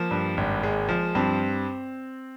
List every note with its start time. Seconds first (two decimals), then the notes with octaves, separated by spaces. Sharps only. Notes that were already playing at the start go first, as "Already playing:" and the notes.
Already playing: F3 A#3
0.11 G2
0.37 G#1
0.63 G#3
0.89 F3
1.15 G2 C4